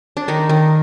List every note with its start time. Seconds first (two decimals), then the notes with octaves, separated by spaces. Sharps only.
0.17 D4
0.28 D#3 D#4
0.49 D#3